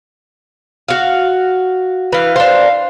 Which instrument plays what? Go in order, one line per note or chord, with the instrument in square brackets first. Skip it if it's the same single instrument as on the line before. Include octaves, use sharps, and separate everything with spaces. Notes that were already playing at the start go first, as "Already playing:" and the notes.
[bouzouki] F#4 F5
[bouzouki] E3 F5 [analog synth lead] B4
[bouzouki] D4 C5 [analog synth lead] F5